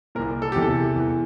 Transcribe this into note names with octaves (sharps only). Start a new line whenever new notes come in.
C2 A#2 A#4
A4
E2 C3 E3 G4
A4
E2 E3